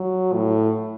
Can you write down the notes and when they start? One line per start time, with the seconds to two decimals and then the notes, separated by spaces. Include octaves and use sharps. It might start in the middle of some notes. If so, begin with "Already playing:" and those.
Already playing: F#3
0.33 A2